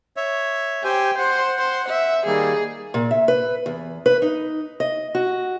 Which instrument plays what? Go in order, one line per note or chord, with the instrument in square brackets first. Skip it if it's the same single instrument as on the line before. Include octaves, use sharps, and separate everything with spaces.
[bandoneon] C#5 E5
[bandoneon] G4 C5 G#5 [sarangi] G5
[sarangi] C5 [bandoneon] F#5
[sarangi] C5
E5
[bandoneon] D#3 G3 A#3 [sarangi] G#4
[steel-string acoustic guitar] A#2
E5
B4
E2
B4
D#4
D#5
F#4